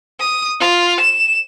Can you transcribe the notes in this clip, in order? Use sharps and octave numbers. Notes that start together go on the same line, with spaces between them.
D#6
F4
E7